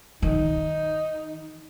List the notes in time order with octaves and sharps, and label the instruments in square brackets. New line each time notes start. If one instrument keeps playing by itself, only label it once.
[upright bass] D#3 [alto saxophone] D#4